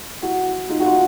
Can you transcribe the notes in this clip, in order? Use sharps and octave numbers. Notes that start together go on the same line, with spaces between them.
E4 F#4
D#4 F4
F#4
D#4 F4